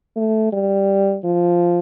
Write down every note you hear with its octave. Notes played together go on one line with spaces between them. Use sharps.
A3
G3
F3